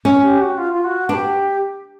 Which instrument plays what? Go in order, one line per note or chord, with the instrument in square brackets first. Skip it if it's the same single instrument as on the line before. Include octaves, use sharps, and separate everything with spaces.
[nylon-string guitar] C#4
[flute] G4
F#4
F4
F4
F#4
[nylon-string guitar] D4 [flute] B4
[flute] G4